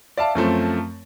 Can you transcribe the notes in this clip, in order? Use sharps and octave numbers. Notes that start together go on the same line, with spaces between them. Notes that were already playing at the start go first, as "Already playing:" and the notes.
D5 E5 F5 A5
F#2 F3 A3 C4